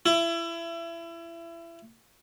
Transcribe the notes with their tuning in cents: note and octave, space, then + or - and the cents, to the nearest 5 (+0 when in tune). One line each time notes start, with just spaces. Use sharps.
E4 +30